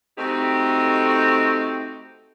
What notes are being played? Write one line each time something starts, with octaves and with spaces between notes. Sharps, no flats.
A3 C4 D#4 F#4 G4 A4